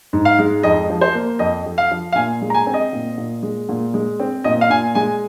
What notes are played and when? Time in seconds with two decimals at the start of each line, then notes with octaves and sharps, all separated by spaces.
0.13 G#2
0.25 F5
0.39 G#3
0.63 F2 D#5
0.90 F3
1.01 C5
1.14 A#3
1.39 F2 D#5
1.66 F2
1.78 F5
1.91 F3
2.12 F5
2.15 A#2 G#5
2.42 G#3
2.50 A#5
2.54 G#5
2.66 C4
2.74 D#5
2.93 A#2
3.18 A#2
3.43 G#3
3.69 A#2
3.94 G#3
4.20 C4
4.44 A#2 D#5
4.61 F5
4.70 A#2 G#5
4.95 G#3 G#5